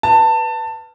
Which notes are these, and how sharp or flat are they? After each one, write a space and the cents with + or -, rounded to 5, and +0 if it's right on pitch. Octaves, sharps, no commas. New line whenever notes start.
B4 +0 A5 +20